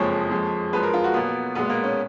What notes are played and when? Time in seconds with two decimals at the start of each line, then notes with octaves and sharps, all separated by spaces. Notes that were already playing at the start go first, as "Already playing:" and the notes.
Already playing: F#1 F2 F3 G#3 C#5
0.31 F2 F3 G#3
0.73 F#2 F3 G#3 B4
0.83 A#4
0.94 F4
1.04 F#4
1.14 B1 B2 A#3 B3
1.55 B1 A#2 G#3 B3
1.70 A#3
1.84 C#4